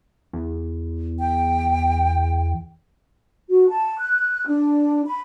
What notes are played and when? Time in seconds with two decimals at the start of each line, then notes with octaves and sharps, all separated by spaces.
0.33 E2
1.20 G5
3.50 F#4
3.70 A5
3.99 F#6
4.47 D4
5.06 B5